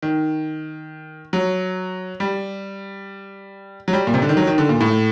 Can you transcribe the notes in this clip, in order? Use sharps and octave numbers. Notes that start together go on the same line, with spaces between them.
D#3
F#3
G3
F#3
G3
A#2
C3
D3
D#3
F#3
D#3
D3
A#2
A2